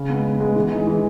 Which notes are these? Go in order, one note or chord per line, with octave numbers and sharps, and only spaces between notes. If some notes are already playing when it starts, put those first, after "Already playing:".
Already playing: C#3
G#3 B3
C#3
G#3 B3
E3
G#3 D#4
E3